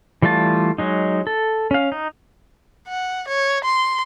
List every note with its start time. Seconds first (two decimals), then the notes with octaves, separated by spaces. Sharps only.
0.22 E3 G3 A3 F4 A5
0.78 F#3 G#3 D#4
1.27 A4
1.71 C#4 F5
1.92 D#4
2.88 F#5
3.28 C#5
3.64 C6